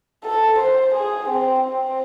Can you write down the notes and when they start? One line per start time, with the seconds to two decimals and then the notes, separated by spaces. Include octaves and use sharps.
0.24 A4
0.59 C5
0.95 G#4
1.29 C4
1.63 C4